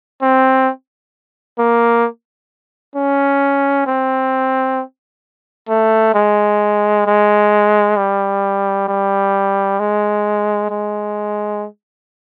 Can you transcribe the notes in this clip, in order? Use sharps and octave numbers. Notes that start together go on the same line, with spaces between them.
C4
A#3
C#4
C4
A3
G#3
G#3
G3
G3
G#3
G#3